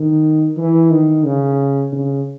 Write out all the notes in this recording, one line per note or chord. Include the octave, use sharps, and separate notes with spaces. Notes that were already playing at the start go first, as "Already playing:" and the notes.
Already playing: D#3
E3
D#3
C#3
C#3